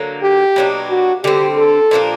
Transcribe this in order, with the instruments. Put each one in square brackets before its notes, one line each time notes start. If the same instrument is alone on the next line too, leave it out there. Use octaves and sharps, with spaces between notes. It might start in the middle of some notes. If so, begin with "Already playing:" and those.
Already playing: [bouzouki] D3 F#3 A#3
[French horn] G4
[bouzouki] B2 F#3 A#3 D4
[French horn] F#4
[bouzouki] D3 G3 C4 [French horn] G4
[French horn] A4
[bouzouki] A#2 F3 A#3 D4